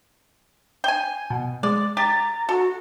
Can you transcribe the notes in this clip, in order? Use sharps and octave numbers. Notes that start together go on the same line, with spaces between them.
G5 G#5
B2
G#3 D5
G4 A#5 A6
F#4 A4